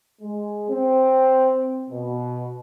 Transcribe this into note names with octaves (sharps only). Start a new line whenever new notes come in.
G#3
C4
B2